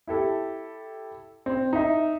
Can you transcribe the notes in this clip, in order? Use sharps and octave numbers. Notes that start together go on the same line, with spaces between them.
E4 G4 A4
C4
D#4 E5